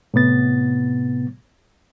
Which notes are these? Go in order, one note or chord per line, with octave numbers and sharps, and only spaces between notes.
A2 C3 B3 A6